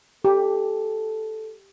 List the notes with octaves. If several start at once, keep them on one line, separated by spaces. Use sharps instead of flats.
G4 A4